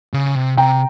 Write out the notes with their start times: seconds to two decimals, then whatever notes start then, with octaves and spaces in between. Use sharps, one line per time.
0.14 C#3
0.35 C3
0.57 C3 G5 A#5